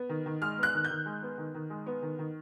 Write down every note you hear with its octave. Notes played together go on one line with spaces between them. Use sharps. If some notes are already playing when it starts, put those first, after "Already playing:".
Already playing: B3
D#3
D#3
G#3 F6
B3
F#6
D#3
G6
D#3
G#3
B3
D#3
D#3
G#3
B3
D#3
D#3